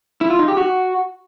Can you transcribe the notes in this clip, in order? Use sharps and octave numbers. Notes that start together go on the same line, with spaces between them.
E4
F4
D#4
G4
F#4